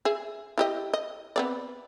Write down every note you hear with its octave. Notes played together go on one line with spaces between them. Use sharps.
G#4 E5
E4 G4 D#5
D#5
B3 C4 D5